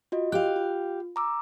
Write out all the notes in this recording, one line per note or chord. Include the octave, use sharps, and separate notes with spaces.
F4 F#4 D#5
G4 F5 F#6
F4
A#5 D6 E6